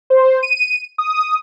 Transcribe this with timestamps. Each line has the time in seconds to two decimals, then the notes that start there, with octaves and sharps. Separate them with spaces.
0.10 C5
0.43 D#7
0.98 D#6